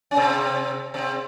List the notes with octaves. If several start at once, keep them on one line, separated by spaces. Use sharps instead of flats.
C#4
C3 C4
C3 C4